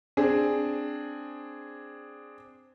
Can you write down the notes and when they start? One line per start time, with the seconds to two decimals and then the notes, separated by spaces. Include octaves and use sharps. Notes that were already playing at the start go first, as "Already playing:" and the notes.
0.17 C4 D4 G#4